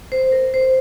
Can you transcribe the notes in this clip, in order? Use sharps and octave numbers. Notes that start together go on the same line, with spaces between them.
C5
A#4
C5